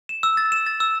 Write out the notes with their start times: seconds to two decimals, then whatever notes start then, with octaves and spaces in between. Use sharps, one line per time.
0.09 E7
0.23 E6
0.37 A6
0.52 E7
0.66 A6
0.80 E6